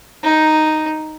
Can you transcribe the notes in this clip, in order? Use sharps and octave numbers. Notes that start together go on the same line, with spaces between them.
D#4